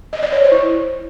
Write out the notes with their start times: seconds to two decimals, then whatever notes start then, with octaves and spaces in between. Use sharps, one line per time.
0.13 D#5
0.23 D5
0.32 C#5
0.42 C5
0.52 E4